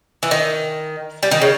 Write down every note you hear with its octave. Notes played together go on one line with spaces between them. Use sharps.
E3
D#3
G3
D#3
C#3